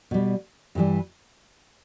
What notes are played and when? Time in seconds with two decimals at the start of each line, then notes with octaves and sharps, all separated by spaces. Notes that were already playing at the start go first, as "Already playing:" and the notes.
0.11 B2 G3
0.75 G2 E3 G3